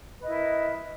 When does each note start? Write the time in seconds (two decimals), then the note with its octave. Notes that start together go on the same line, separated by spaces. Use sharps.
0.18 B4
0.21 D#5
0.24 A#4
0.26 E4